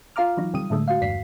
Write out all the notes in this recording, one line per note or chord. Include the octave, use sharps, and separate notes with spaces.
F4 F5 A#5 D6 F6
E3 F#3 D#4
D2 C3 G3 D#6 D#7
A2 D3 G#3 A3
F#4 F5
G1 E2 G2 B6 C7